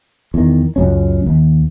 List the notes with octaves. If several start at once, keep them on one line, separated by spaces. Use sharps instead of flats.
E2 D#3
C#2 F#2 C#4
D#2